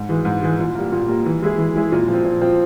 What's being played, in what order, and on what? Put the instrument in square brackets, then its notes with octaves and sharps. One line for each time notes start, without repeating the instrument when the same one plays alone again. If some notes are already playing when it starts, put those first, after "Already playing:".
Already playing: [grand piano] G#2
E3 G#3
G#2
E3 G#3
A#2
G3 A#3
A#2
G3 A#3
E3
G#3 E4 G#4
E3
G#3 E4 G#4
A#2
F3 C4
A#2
F3 C4